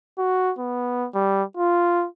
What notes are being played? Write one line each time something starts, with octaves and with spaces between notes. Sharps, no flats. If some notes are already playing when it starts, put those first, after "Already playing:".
F#4
B3
G3
F4